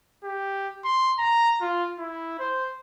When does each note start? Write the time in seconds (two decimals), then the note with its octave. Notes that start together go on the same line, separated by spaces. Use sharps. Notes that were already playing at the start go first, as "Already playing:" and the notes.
0.24 G4
0.85 C6
1.19 A#5
1.61 F4
1.99 E4
2.39 C5